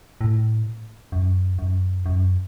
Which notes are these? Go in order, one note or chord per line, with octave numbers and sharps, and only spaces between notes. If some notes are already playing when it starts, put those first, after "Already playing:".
A2
F#2
F#2
F#2